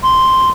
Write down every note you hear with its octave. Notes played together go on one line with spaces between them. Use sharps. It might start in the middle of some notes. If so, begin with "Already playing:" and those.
C6